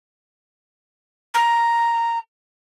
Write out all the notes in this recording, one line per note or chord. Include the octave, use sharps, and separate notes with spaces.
A#5